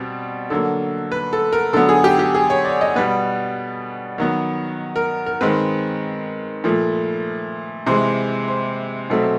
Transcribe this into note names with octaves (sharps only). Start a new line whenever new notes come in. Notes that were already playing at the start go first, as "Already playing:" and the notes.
Already playing: B2 G3 C4
D3 F#3 A#3 A4
B4
A4
A#4
D3 F#3 B3 A4
G#4
G4
G4
G#4
C#5
D5
D#5
B2 G3 B3 B4
D#3 F#3 B3
A#4
A#4
D#3 G#3 C4 B4
A#2 F3 A3
C3 E3 G#3 C5
C5
B2 F#3 A3 C4